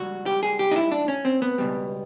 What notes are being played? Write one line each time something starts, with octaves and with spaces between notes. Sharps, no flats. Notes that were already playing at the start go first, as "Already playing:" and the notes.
Already playing: C#2 G3 F#4
G4
G#4
G4
D#4
E4
D4
C#4
C4
B3
C#2 B2 G3